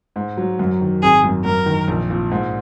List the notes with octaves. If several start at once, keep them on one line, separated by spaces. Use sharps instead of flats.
G#2
F#3
F#2
D#3
G#1 G#4
F#2
F#2 A#4
D#3
A#1
A#2
G#2